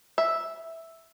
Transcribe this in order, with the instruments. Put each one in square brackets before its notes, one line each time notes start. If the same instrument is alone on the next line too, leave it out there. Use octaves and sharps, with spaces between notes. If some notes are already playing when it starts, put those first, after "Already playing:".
[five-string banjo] E5